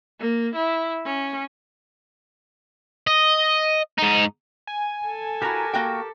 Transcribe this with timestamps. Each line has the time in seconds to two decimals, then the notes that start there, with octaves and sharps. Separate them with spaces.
0.19 A#3
0.55 E4
1.05 C#4
3.07 D#5
3.98 G#2 D#4
4.67 G#5
5.06 A4
5.42 E4 F#4 G4 A#4 A#5
5.73 A#3 F#4 G5